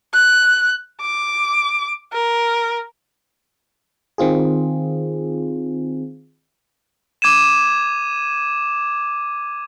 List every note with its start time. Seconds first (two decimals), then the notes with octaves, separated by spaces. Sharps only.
0.14 F#6
1.01 D6
2.13 A#4
4.18 D#3 C4 F4 G#4
7.22 D6 G#6 D#7 E7